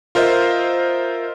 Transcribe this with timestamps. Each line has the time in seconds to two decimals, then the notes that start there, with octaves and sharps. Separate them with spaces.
0.15 F4 A#4 C5 D#5 E5